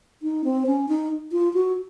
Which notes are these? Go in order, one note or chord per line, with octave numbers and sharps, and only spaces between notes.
D#4
C4
C#4
D#4
F4
F#4